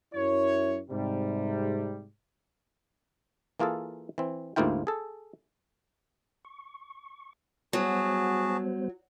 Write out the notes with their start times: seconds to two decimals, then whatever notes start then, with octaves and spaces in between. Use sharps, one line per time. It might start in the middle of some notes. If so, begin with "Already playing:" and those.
0.14 F#2 E4 C#5
0.89 G#2 C3 G3
3.60 E3 A#3 F4 G#4 A4
4.18 E3 C4
4.56 D2 G#2 A#3 E4 F4 G5
4.87 G#4 A4
6.45 C#6
7.73 F#3 G3 B3 F#4 G#4 C5 A5